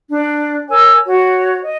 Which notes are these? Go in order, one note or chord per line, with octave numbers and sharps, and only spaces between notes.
D4
A#4 C#5 G#5 E6
F#4 C#5
D#5